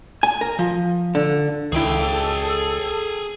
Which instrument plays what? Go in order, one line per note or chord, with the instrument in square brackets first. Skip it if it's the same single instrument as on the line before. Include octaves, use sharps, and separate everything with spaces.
[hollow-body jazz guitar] G#5
A#4
F3
D3
[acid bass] C#2 [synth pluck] D#3 E4 [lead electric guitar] G#4 G5 [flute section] A4